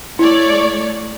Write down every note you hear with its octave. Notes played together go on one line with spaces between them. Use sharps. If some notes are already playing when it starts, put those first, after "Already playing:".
A3 E4 C#5 D5